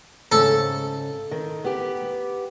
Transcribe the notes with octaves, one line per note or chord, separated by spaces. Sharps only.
G#2 C#3 A4
D#3
B3 G4